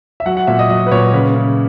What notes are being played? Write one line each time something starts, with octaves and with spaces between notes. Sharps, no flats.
E5
F#3 F#5
F#5
A#2 E5
D#5
F#3 D#5
B4
A#2 C#5
C#3 B4
C#3